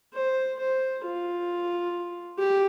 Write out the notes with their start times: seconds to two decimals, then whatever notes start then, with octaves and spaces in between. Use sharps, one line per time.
0.14 C5
0.60 C5
1.04 F4
2.38 G4